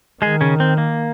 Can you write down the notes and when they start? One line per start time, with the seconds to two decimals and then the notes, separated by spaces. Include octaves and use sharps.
0.22 D#3 G#3 G#4
0.41 C#3 C#4
0.60 C4
0.78 A#3